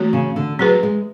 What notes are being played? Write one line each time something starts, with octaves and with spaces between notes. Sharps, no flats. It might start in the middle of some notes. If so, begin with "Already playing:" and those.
Already playing: E3 A3 C#4 F#4
C#3
D3
F#3 C#4 G#4 B4
G#3